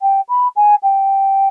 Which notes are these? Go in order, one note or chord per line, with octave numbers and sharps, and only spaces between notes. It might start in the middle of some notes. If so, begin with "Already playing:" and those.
G5
B5
G#5
G5